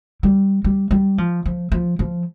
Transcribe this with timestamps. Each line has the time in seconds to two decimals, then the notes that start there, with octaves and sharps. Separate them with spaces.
0.23 G3
0.64 G3
0.91 G3
1.18 F3
1.46 F3
1.72 F3
1.99 F3